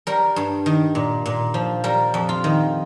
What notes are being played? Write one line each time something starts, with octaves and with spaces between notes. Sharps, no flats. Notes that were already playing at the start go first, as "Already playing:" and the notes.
G3 A#4
G2
D#3
A#2
A#2
F3
G3 A#4
F2
F4
D#3